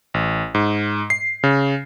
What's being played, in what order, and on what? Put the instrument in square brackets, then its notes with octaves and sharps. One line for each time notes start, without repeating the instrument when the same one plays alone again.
[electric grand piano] A1
G#2
C7
C#3